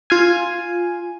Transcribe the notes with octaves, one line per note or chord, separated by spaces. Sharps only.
F4 F5 G#5